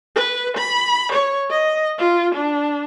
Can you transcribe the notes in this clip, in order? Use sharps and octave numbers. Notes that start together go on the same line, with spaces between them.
B4
B5
C#5
D#5
F4
D4